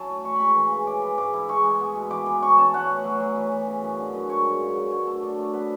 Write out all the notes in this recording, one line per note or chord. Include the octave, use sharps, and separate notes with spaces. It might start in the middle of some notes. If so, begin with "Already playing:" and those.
Already playing: F#3 C#4 E4 A5
A2
E3 C#6
B5
G#3 C#6
E3
C#3
E3 D6
E3
G#2 D6
E4
G#3 C#6
G#3
B3
B2
E3 D6
E3
C#4 C#6
C#4 A5
C#4 F#5
A2
F#3
F#3
E3
E3
C#3
F#2
D3
F#2
G#3 C#5
G#2
C#3
F#3
D3 C#5
A3 A4
D4 A4
A3
B3 B4